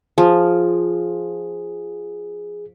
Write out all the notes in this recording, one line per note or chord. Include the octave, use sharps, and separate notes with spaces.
F3 G#4